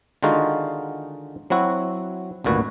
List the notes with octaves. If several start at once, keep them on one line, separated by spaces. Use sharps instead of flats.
D3 D#3 G#3 D#4 F4 F#4
F#3 C4 E4 F#4
G#1 D2 A#2 F#4 B4